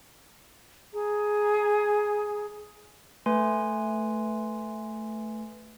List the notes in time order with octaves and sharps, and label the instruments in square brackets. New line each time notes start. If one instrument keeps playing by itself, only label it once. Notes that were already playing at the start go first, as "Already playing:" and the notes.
[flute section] G#4 A#5
[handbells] A3 B4 G#5 C6